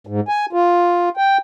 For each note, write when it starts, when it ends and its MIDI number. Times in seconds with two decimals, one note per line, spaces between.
0.07 0.20 44
0.29 0.46 80
0.53 1.09 65
1.17 1.37 79